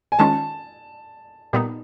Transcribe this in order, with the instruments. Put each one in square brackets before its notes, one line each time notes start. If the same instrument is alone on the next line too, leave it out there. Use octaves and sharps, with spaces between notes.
[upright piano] G#5
[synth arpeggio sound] D#3 G#3 C#4 F4 [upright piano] A5
[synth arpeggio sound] A#2 G3 B3 D#4